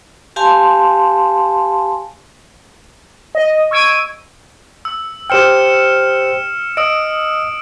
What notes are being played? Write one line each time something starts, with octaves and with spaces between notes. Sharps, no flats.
G4 F5 G#5 A5 C6
D#5
C#6 E6 G#6 D7 D#7
E6
G4 C5 G5 F6 C#7 E7
D#5 D#6 E6 D7